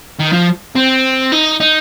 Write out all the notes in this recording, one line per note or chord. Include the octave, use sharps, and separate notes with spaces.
D#3
F3
C4
D#4
D#4